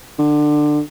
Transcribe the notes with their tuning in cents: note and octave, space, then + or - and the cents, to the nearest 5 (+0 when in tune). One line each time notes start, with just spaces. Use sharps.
D3 +20